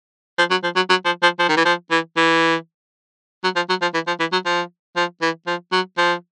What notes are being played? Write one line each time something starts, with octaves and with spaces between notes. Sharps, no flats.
F3
F#3
F3
F#3
F#3
F3
F3
F3
D#3
E3
F3
E3
E3
F#3
F3
F#3
F3
E3
F3
E3
F#3
F3
F3
E3
F3
F#3
F3